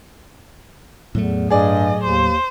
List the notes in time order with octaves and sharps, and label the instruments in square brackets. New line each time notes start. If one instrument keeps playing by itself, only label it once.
[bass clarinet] E2 [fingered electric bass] A2 F#3 A3
[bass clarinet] G2 [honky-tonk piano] G#4 D5 [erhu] D#5
[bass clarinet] D#2 [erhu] C5